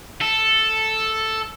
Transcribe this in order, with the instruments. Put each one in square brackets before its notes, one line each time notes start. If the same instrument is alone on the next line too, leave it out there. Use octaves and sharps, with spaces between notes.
[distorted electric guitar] A4